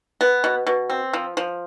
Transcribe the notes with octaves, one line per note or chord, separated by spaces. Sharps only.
B3
B2
B2
C4
F3
F3